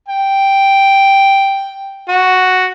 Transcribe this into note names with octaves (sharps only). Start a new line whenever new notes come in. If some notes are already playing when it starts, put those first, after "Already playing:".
G5
F#4